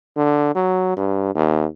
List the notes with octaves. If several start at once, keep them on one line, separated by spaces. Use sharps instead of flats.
D3
F#3
G2
D#2